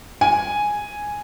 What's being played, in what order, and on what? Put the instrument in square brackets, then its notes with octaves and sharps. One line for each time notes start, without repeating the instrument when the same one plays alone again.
[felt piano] G#5